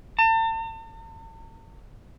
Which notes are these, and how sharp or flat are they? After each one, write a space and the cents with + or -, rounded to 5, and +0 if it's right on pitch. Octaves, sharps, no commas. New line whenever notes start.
A5 +40